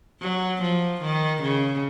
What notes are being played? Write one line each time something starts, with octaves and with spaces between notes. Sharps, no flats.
F#3
F3
D#3
C#3